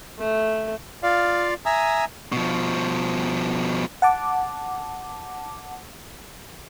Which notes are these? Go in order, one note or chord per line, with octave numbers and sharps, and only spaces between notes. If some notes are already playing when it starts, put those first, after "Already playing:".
A3
F4 D5 F5
E5 G#5 A#5 D#6 E6
B2 F3
F#5 A5 D6